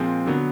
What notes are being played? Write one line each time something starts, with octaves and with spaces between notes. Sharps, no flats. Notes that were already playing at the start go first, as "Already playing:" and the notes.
Already playing: A#2 F3 G#3 C4
D3 F#3 B3